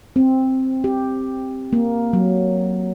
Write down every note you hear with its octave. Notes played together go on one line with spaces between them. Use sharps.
C4
G4
A#3
F#3